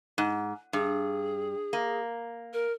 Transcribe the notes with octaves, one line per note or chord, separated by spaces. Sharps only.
G#2
G2 G#4
A#3
A#4